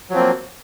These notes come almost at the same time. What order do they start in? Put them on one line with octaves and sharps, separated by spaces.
F#3 F3 C4 A#3